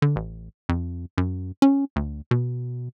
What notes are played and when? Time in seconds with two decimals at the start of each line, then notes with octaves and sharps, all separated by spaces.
0.02 D3
0.16 A1
0.69 F2
1.18 F#2
1.62 C#4
1.96 D2
2.31 B2